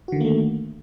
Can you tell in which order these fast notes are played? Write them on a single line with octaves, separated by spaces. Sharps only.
F#4 D3 D#3 A#3 A3